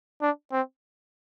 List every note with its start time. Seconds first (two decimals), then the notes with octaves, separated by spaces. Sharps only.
0.21 D4
0.52 C4